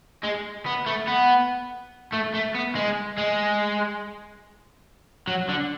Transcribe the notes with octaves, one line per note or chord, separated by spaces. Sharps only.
G#3
B3
A3
B3
A3
A3
B3
G#3
G#3
F#3
D3